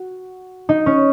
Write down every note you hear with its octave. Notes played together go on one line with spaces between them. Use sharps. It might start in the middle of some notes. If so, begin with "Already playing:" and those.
Already playing: F#4
D#4
C#4